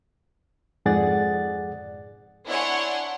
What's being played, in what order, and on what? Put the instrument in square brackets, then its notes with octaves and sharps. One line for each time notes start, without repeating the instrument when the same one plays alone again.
[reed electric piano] F2 G#2 G#4 D5 F#5 A6
[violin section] D4 E4 C#5 F#5 G#5 C6